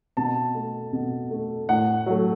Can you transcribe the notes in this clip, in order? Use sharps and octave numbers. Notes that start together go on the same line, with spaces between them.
B2 A5
A3
B2
A3
A2 F#5
F#3 A3